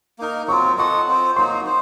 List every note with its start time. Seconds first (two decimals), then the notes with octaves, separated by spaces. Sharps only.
0.18 A#3 D#4 A#4
0.48 F#3 C4 F4 C#6
0.77 F4 A4 D#5 F#5 C#6
1.08 C4 F4 C5
1.36 F#3 A#3 D#4 F#4 C6
1.66 D#4 C5